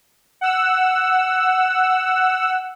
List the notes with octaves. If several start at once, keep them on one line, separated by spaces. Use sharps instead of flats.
F#5 E6